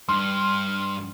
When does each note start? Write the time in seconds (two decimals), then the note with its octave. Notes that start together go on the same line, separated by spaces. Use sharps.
0.09 G2 C6 F6